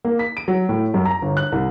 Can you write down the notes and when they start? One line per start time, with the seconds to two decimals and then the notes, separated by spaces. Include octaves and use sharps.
0.05 A#3
0.19 B6
0.37 D7
0.48 F#3
0.69 A2
0.94 F#2
1.05 A#5
1.22 G1
1.37 F#6
1.52 C2